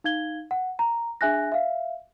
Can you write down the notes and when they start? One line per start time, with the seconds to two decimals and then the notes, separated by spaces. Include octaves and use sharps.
0.04 D#4 F5 G#6 G7
0.51 F#5
0.79 A#5
1.21 D4 G#4 E5 G#5 F#6 A#6
1.52 E5 F5